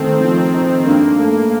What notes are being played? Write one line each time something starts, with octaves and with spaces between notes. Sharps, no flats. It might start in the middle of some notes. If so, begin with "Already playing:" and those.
Already playing: D#3 A3 C4
F3 C4
D#4
G2 A#3
A3